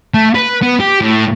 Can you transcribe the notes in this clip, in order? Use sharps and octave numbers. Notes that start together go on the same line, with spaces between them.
A3
B4
B3
G4
A2